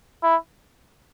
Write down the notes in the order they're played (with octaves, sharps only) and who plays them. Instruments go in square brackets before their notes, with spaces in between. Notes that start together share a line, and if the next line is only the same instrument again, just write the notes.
[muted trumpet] E4